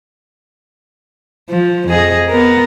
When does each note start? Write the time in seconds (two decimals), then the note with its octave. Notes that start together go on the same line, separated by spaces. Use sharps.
1.50 F3
1.89 F2 G#4 D#5
2.29 B3 A#4